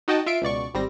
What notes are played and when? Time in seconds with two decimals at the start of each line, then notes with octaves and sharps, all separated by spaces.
0.08 D#4 F#4 D#5 G5 A5
0.26 F4 E5 C7 D7
0.42 C#2 B2 D5 C#6
0.74 G#1 G3 C4 A#6